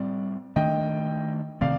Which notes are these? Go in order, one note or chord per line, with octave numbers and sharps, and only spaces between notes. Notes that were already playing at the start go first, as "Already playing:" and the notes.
Already playing: A2 G3 C4 D5
D#3 A3 D4 D#5 G5
C3 D#3 A3 C4 D5 F5